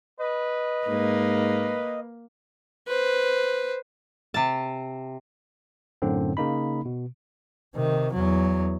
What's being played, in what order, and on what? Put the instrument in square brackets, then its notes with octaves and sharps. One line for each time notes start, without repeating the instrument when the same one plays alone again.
[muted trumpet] B4 [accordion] D#5
[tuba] G#2 [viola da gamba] A#3
[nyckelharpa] B4 C5
[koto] C3 A5
[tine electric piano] F#2 A2 D3 C4
C#3 A#3 D#4 B5
B2
[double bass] C3 D#3
E2 F#3